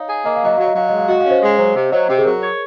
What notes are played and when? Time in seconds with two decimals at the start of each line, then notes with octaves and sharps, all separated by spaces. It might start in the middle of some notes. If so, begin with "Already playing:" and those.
Already playing: D#4 C#5 F5
0.09 G#4
0.25 A#3 D#5
0.36 F5
0.42 F#3 D#5
0.57 F#3 F5
0.67 D#5
0.75 F#3 F5
0.89 G#3 D#5
0.99 F5
1.08 F#4 D#5
1.21 C#4 F5
1.30 C5 D#5
1.42 G#3
1.59 F#3 C5
1.76 C3
1.92 F#3 C5 D#5
2.09 C3
2.18 G#4
2.25 F#3 A#4
2.42 C#5